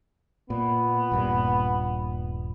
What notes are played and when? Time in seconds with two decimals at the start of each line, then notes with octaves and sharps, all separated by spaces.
0.50 A#2 B3
1.12 D#1 G2 A#2